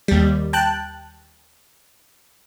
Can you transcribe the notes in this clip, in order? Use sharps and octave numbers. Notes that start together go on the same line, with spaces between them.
D#2 G3
G5 A5 F#6